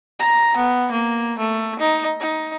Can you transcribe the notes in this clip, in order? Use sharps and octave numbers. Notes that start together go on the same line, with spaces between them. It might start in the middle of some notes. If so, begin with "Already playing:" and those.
A#5
B3
A#3
A3
D#4
D#4